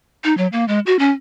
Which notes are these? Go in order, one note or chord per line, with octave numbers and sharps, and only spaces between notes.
D#4
F#3
A#3
G#3
F#4
C#4